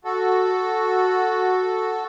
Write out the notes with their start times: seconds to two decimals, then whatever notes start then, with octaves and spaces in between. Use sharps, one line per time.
0.05 F#4 A4